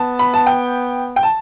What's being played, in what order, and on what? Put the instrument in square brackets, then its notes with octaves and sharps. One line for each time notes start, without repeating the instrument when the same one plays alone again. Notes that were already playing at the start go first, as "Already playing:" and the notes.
Already playing: [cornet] B3 [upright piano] A5
[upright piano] B5
A5
G5
G5
A5